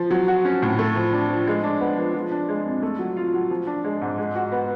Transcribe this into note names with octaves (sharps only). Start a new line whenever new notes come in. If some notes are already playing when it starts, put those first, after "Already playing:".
Already playing: F3
F#3
F#4
C#4
A2
A3
F3
D4
F3
G#3
D4
B3
F3
F3
D4
G#3
F2
A3
F#3
F4
F#3
F3
D4
G#3
G#2
G#3
F#4
B3